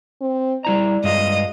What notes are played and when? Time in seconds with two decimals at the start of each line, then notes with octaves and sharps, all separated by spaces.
0.21 C4
0.65 G3 E4 D5 A#5
1.04 G2 G#3 F4 D#5